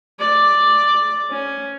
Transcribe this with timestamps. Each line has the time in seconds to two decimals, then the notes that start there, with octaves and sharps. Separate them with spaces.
0.20 D5
1.30 C#4